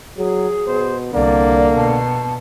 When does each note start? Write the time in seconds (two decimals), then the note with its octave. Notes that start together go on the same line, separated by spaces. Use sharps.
0.17 F#3 G#4
0.67 B2 C5
1.13 C2 D3 A#3 D5
1.75 B2 A5